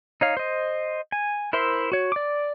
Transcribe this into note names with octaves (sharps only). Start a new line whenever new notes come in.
D#4 C#5 F5
C5 D#5
G#5
E4 A#4 C5 E5 C6
F#4 C#5
D5 D6